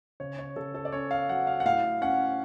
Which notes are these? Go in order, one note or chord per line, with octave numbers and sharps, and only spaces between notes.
C#3 C#5
C#5
C#3 A4
A4
D5
C#4 C#5
F5
F#3 F#5
F5
F#5
A2 F5
C#4 F#5